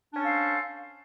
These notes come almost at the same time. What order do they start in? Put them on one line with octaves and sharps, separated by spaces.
D4 C#4 A4 F5 C5